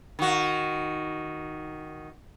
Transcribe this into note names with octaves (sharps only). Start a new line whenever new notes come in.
D#3 F#4